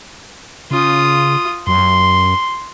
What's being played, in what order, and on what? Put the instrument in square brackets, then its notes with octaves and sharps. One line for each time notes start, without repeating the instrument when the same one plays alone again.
[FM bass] C#3 [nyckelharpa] F4 D#6
[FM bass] F#2 [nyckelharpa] C6